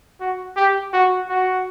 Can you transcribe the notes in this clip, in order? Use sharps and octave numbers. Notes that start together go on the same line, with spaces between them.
F#4
G4
F#4
F#4